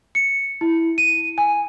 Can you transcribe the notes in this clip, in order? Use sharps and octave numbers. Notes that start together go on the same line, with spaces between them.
C#7
E4
D#7
G#5